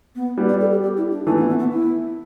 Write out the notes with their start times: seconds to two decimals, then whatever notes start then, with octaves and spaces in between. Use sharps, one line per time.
0.15 B3
0.37 G3 B3
0.49 D5
0.60 A4
0.71 G4
0.83 G4
0.97 E4
1.11 D4
1.27 E3 A3 D4
1.38 B3
1.49 B3
1.59 B3
1.71 E4